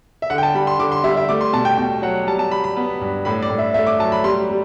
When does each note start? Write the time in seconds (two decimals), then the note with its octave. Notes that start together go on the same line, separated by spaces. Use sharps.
0.22 E5
0.30 D3 F#5
0.38 G5
0.43 A5
0.54 G3 B5
0.67 C6
0.79 D3 D6
0.92 C6
1.04 G3 E5
1.17 E5
1.29 A3 D6
1.41 C6
1.53 B2 A5
1.65 G5
1.78 B2 G5
2.02 F#3 F#5
2.27 G3 A5
2.39 A5
2.51 G3 B5
2.64 B5
2.77 B3
3.01 G2
3.25 A2 B5
3.42 D5
3.50 A2
3.59 E5
3.74 A3 E5
3.87 D6
3.99 F#3 A5
4.12 B5
4.24 G3 C6
4.49 G3